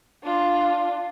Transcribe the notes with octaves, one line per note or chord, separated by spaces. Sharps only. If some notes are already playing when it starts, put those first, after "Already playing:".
D4 F4